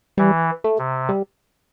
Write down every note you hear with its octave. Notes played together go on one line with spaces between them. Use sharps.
E3 G3
A3
C3
G3